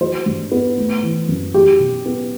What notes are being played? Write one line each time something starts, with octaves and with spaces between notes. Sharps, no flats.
F#3 C5
G2
B3
A3
E3
F#2
F#3 G4
B2
B3